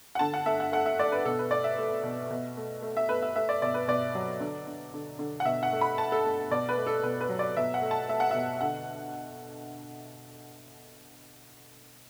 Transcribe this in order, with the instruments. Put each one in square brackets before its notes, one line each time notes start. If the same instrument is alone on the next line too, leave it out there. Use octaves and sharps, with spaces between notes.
[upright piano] F#5
D3 A5
F#5
A3 E5
F#5
A3 F#5
E5
A3 D5
B4
B2 A4
B4
A3 D5
E5
A3
B2
B2
A3
A3
E5
A3 B4
E5
A3 E5
D5
B2 D5
B4
B2 D5
F#3
D3
D3
D3
D3
F#5
B2 E5
F#5
A3
B5
A3 A5
A4
A3
B2 D5
B4
A3
A4
B2 B4
B4
F#3
D5
B2 E5
F#5
A3
A5
A3 E5
F#5
B2 E5
D3 F#5